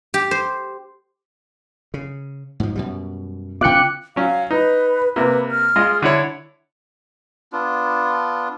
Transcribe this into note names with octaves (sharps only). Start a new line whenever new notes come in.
G4
C5
C#3
G#2 F3
F#2 B2 G3
C#3 B3 F4 G5 D6 F#6 C#7
F#3 C#4 F5
D#4 B4
C3 A#3 B4
F6
G#3 F4 D#5
D3 E4 C#5
B3 D4 F4